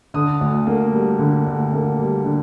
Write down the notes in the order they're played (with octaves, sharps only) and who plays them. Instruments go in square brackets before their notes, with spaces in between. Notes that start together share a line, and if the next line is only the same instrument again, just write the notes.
[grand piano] D3 D#6
D2
A#3
G3
D3
D2
A#3
G3
D3